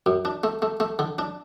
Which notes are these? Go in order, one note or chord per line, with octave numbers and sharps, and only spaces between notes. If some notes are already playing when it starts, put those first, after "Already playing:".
F#2
D4
A3
A3
A3
D3
D4